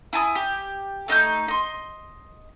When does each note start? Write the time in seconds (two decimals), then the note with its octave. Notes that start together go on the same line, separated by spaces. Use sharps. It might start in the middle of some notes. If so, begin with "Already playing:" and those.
0.13 E4 G#5 A5 D#6
0.35 G4
1.08 A3 D#4 G5 G6
1.48 D#5 C6